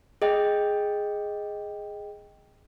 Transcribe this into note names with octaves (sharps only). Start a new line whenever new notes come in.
G#4 D#5 G5